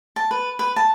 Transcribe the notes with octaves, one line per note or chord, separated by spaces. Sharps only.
A5
B4
B4
A5